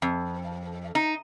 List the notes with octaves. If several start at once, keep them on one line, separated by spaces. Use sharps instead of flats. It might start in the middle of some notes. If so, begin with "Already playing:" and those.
F2
D#4